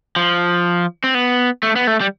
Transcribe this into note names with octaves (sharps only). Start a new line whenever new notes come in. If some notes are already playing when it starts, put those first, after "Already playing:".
F3
C4
B3
A3
B3
A3
G3